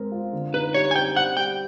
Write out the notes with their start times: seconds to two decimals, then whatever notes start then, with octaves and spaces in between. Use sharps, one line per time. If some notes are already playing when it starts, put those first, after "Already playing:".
Already playing: G#3 C4 A#4
0.12 F4
0.33 D3
0.54 D#4 B4
0.74 G3 C#5
0.91 G#5
0.95 C4 G5
1.16 G3 F#5
1.37 G3 G5